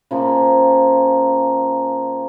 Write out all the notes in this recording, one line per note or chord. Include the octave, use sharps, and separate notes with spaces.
C#3 F3 A#3